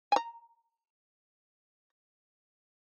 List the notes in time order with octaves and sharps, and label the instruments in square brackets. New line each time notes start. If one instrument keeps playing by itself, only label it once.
[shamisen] G#5 A#5